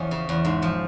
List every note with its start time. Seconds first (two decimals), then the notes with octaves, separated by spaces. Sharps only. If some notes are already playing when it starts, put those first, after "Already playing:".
Already playing: E2 F3 C#4
0.11 C#3
0.29 E2
0.45 G#2
0.62 F3